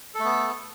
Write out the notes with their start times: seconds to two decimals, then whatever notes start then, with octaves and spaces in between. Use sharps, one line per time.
0.15 A4
0.20 A3
0.24 B3